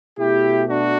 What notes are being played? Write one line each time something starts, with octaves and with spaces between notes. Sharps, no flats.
B2 A3 E4 G4
D4 F#4